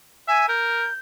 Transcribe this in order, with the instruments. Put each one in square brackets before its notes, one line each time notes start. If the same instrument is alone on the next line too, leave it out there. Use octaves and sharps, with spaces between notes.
[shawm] E5 [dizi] G#5
[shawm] A#4 [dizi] G6